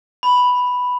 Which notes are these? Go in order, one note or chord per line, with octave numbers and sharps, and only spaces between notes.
B5